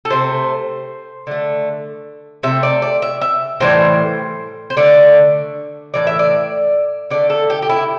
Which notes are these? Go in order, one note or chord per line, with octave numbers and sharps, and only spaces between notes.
A4
C3 A3 C5
D3 A3
C3 A3 E5
D5
D5
E5
E5
A2 E3 G3 C5
C5
D3 A3 D5
A2 E3 D5
E5
D5
D3 A3 D5
A4
G4
G4
E4